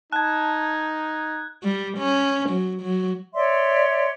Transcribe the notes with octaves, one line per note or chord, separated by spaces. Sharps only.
D#4 A5 F#6 G#6
G3
C#4
F#3
F#3
C#5 D5 E5 C6